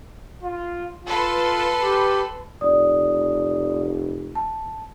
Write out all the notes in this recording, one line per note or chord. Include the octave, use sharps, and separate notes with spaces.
F4
F4 A4 B4 C6
G4
F1 D5 D#6
A5